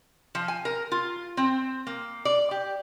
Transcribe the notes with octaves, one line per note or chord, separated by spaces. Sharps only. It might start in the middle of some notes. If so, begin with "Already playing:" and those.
F3
G#5
A#4
F4
C4
A#3
D5
G4